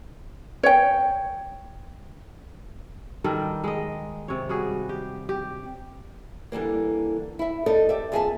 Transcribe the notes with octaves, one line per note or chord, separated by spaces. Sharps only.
C#5 G5
D#3 G3 A4 A#4
G#3 D#5
C3 C#5
G3 F#4 G#4
G4
G4
D3 E3 G3 A#3
E4 E5
D#4 A4 A#4 D5 D#5
G4 D5 E5
F2 A#3 G#4 A4 E5 A5